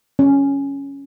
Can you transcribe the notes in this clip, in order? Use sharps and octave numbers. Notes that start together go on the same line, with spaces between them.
C#4